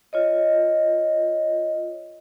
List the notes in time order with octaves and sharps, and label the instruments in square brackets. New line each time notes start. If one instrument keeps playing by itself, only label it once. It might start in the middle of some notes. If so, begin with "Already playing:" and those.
[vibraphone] F4 C#5 D#5